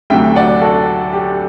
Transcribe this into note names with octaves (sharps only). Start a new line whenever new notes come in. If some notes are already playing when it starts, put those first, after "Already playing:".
D2 C3 F#3 E5 G5
D5 F#5
F#4 A4
G4